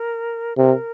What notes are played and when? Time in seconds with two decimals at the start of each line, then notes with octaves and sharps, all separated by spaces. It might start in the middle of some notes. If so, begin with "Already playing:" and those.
Already playing: A#4
0.57 C3 A#4